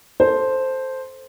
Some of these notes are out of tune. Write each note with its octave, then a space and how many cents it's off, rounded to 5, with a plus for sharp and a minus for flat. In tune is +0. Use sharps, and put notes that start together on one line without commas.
A4 +0 C5 +0